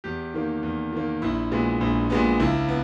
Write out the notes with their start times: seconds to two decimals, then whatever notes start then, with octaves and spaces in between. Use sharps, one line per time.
0.04 E2 G4
0.34 D#3 A#3
0.63 E2
0.93 D#3 A#3
1.22 A#1 E4
1.51 A#2 G#3 B3
1.81 A#1
2.10 A#2 G#3 B3
2.40 C#2 E4
2.68 B3